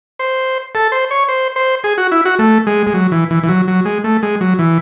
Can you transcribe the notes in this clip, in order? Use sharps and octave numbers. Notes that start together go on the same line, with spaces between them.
C5
A4
C5
C#5
C5
C5
G#4
F#4
E4
F#4
A3
G#3
G#3
F#3
E3
E3
E3
F#3
F#3
G#3
A3
G#3
F#3
E3